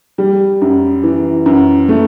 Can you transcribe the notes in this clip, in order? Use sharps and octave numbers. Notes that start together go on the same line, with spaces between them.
G3
F#2
E3
F#2
A3